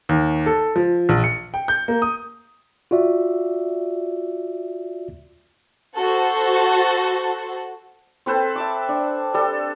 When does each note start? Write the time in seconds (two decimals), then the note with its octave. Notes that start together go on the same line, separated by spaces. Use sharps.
0.09 D#2
0.46 A4
0.76 F3
1.09 A#1
1.24 C#7
1.54 G5
1.68 G6
1.88 A#3
2.02 D#6
2.91 F4 F#4 D5 E5
5.97 F#4 A4 C5
8.26 C4 A4 B4 C5
8.56 E5 A5 D6
8.89 D4
9.34 G3 A4